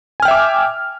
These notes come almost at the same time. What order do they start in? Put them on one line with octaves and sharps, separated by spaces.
G#5 F6 G5 E5 D6